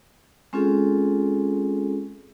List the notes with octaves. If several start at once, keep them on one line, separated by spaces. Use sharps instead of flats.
G#3 C4 C#4 F4 G#4 A4